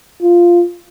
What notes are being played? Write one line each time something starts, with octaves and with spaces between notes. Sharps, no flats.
F4